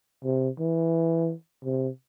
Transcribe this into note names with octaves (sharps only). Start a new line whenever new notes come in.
C3
E3
C3